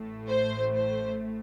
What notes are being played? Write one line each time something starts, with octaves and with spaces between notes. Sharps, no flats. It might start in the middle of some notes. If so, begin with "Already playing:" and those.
Already playing: A1 A2 A3
C5
C5